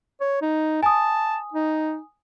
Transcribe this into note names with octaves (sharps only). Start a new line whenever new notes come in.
C#5
D#4
G#5 A5 D#6
D#4